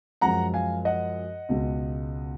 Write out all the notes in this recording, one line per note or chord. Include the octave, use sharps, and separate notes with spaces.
F#2 F3 G#3 F#5 A#5
F5 G#5
D#5 F#5
C#2 B2 G#3